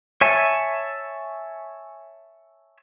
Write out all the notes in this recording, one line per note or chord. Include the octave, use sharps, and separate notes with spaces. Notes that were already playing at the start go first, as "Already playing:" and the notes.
C#5 E5 G#5 A5